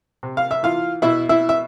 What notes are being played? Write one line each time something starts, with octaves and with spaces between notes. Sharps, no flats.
C3
F5
E5
E3 F4 F5
B2 E4 E5
E4 E5
E5